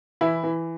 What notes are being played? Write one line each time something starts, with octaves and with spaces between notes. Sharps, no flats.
E3 E4
E3